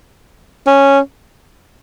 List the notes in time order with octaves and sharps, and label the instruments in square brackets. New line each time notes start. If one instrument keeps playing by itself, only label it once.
[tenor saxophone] C#4